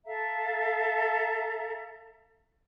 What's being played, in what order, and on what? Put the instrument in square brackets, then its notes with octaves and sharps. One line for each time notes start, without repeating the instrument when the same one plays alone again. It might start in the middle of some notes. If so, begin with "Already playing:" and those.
[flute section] A4 E5 F5 A#5